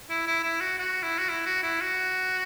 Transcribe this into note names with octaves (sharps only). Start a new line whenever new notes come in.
E4
E4
E4
F#4
F#4
E4
F#4
E4
F#4
E4
F#4